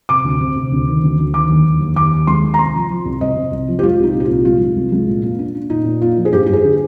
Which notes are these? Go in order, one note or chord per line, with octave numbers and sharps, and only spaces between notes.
C3 D6
D2
C3
C3
D2
D#3
D2
D2
D#3 D6
D#2
D#2
D#2
D#2 D6
D#2
G#3 C6
D#3
A#5
C2 C6
F3
F3
C2
C2 D#5
C3
C2
F3
G4
G#3 F4
C2 D#4
A#2
G4
C2 F4
G#3 F4
G#3
C2
G#3
A#2
A#3
D4
D4
A#2 D#4
A#2
A#3 F4
F3
G#4
G2 G4
G2 G4
G#4
D3